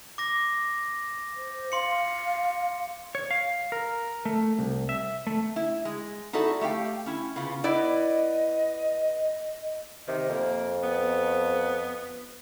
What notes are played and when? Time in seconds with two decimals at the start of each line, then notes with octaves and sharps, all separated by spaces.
0.18 D6 A#6
1.37 C5
1.72 F5 C6 C#7
3.15 C#5
3.31 F5
3.72 A#4
4.25 A3
4.59 C2
4.89 E5
5.27 A3
5.56 E4
5.85 G#3
6.33 D#4 E4 F#4 A4 D5
6.61 A3 G4 F5 G5
7.06 C#4 E4
7.36 C#3 B3 F4
7.64 B3 E4 D5 D#5
10.08 C3 D#3
10.29 F2 A#3
10.84 B3